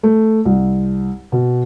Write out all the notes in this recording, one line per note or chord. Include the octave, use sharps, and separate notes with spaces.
A3
C2
B2